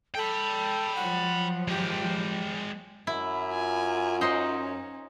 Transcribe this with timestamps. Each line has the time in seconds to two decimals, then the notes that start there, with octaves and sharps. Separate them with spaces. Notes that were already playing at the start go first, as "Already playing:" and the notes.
0.15 A4 G5 B5
0.95 F3 F#3 F#5
1.68 G#3 G4 G5
3.07 F#2 E4
3.52 F4 G#5
4.21 C#4 D#4 C5 F#5